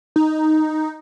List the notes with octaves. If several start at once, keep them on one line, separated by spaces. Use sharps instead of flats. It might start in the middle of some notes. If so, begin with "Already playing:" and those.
D#4